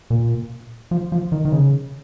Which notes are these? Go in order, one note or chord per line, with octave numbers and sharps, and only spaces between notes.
A#2
F3
F3
D#3
D#3
C#3